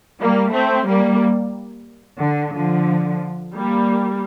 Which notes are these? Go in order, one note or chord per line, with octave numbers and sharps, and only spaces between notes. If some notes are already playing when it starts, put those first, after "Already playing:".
G3 A#3
A3 C4
G3 A#3
D3
D3 F3
G3 A#3